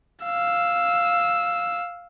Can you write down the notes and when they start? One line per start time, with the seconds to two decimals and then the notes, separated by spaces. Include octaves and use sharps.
0.24 F5 E6